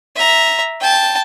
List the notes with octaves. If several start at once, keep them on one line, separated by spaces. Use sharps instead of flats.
E5 A#5
G5 A5